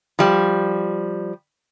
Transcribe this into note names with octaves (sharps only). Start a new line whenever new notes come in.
F3 G3